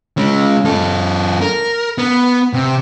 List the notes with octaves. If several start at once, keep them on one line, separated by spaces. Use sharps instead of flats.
G#3 C#4
F#2 A4
A#4
B3
C3